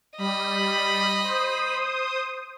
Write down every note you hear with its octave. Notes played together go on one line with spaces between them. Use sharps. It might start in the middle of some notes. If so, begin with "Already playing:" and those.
G3 D#5 B5
C5 D#6